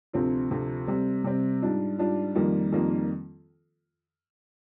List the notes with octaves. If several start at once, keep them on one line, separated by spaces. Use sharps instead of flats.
D2 C3 F3 C4 F4
D2 C3 F3 C4 F4
C3 G3 C4
C3 G3 C4
G#2 G3 D4 F4
G#2 G3 D4 F4
F2 D#3 G3 A#3 F4
F2 D#3 G3 A#3 F4